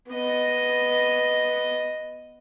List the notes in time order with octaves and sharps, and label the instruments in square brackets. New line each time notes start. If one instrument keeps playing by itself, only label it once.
[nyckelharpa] B3 D#5